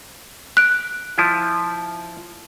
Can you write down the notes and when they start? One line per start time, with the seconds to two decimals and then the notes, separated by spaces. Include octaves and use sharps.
0.57 F#6 D7
1.18 F3 E4